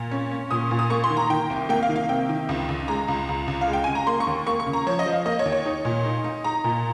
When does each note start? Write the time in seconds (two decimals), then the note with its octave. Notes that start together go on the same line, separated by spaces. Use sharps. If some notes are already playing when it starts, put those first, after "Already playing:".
Already playing: A#2
0.11 C#4
0.31 C#4
0.51 A#2 D#6
0.71 A#2
0.79 D#6
0.90 A#3 C#6
1.04 C6
1.10 D#3
1.17 A#5
1.30 D#3 G5
1.50 C2
1.69 A#3 G5
1.83 F5
1.89 D#3
1.96 F5
2.09 C3 G5
2.29 D#3
2.49 C#2
2.69 C#2
2.88 G#3 A#5
3.08 C#2
3.29 C#2
3.48 C#2
3.61 F5
3.68 G#3
3.73 G5
3.84 C#3 G#5
3.95 A#5
4.07 A#3 C6
4.20 C#6
4.27 D#2
4.47 A#3 C#6
4.60 C#6
4.66 C#3
4.73 A#5
4.86 F3 C#5
4.99 D#5
5.06 F3
5.13 F5
5.26 A#3 D#5
5.39 C#5
5.45 D#2
5.52 C#5
5.66 D#4
5.85 A#2
6.05 D#4
6.24 D#4
6.44 D#4 A#5
6.64 A#2